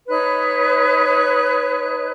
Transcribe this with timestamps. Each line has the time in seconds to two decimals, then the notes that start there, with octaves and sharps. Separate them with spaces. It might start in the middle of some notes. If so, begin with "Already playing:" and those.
0.08 D#4 B4 C#5 F#6